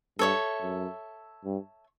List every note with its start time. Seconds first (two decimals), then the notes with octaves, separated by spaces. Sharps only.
0.19 G2 A4 C#5 E5
0.62 F#2
1.45 G2